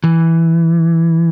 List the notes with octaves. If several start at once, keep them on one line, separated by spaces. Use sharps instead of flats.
E3